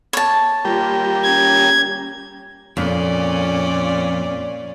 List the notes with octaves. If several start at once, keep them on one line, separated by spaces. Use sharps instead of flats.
C#5 A5
G3 A#3 F4 G4
C#4 G#6
F2 A#2 C#4 D5